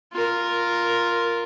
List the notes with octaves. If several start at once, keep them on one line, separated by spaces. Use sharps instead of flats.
F4 A#4